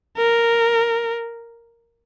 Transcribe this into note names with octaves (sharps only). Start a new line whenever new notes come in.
A#4